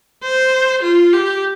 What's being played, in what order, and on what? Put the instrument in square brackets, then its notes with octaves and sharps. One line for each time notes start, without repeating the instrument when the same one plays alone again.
[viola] C5
F4
G4